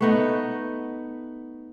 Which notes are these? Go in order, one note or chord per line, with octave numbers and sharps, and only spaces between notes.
A3 B3 D#4